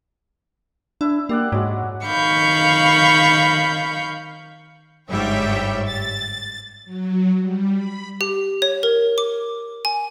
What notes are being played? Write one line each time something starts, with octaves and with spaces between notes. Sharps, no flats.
D4 E4 E5
A#3 G4 D5 F#5
G#2 F#3 G#3
D#3 F5 B5 C#6 G6
G1 G#2 G3 C#5 E5 G5
A6
F#3
G3
B5
G4
C#5
A#4
D6
G#5